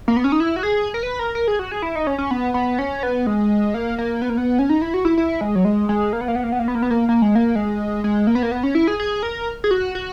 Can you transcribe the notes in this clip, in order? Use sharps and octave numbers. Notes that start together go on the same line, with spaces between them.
A#3
B3
C#4
D#4
E4
F#4
G#4
A#4
B4
A#4
A#4
G#4
F#4
G#4
E4
D#4
C#4
C#4
B3
B3
C#4
B3
G#3
A#3
A#3
B3
A#3
B3
C#4
D#4
E4
F#4
E4
E4
G#3
F#3
G#3
G#3
A#3
B3
A#3
B3
A#3
B3
A#3
B3
A#3
B3
A#3
A#3
G#3
A#3
G#3
G#3
A#3
B3
A#3
B3
C#4
E4
G#4
G#4
A#4
G#4
F#4
F#4